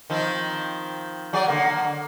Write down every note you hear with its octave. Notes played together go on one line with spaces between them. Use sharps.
D#3 F3 C4
F#3 G#4 D5
D3 D#3 A#3